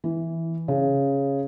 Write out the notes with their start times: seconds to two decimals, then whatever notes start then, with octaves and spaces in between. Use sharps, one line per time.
0.04 E3
0.68 C#3